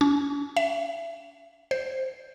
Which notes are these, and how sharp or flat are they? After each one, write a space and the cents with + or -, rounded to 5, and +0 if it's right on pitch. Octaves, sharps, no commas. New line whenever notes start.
C#4 +45
E5 +30
C5 +0